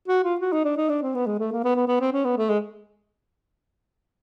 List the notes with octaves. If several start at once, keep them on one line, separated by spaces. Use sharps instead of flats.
F#4
F4
F#4
D#4
D4
D#4
D4
C4
B3
G#3
A3
A#3
B3
B3
B3
C4
C#4
B3
A3
G#3